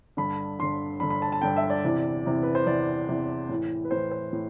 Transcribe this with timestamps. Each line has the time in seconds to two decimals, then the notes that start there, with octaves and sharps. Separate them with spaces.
0.17 G2 D3 B5
0.59 G2 D3 C6
1.00 G2 D3 B5
1.10 B5
1.22 A5
1.32 A5
1.42 G2 D3 G5
1.57 E5
1.70 D5
1.84 E2 C3 E3
2.25 E2 C3 E3
2.43 B4
2.55 C5
2.66 E2 C3 E3 D5
3.08 E2 C3 E3
3.49 A2 E3
3.85 B4
3.91 A2 E3 C5
4.11 C5
4.33 A2